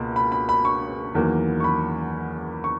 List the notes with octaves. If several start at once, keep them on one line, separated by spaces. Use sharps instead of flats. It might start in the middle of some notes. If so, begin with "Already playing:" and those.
Already playing: C#2 B2 A#3
B5
B5
B5
C#6
E2 D#3 F#3 A#3
C#6
B5
C#6